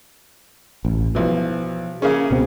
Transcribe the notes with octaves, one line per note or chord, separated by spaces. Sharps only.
A1
B1 B2 E3 F3
C#3 A#3 C#4 G#4
C#2 B2 C4